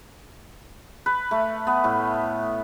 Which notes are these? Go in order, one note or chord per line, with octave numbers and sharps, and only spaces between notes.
B4
A3
B3
A2